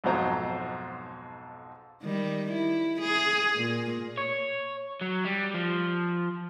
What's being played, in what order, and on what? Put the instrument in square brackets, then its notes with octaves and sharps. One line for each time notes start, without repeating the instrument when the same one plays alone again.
[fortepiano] B1 F2 G#2 F#3 C5 A#5
[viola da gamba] D#3 G3
E4
G#4
A#2
[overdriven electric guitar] C#5
F#3
G3
F3